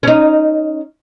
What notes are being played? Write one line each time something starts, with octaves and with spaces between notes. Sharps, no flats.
C#4 D#4